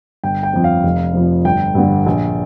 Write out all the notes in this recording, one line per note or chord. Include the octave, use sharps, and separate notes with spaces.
G1 G5
G5
F2 F3
F5
F1
F2 F3
G1 G5
G2 D3 G3
A#1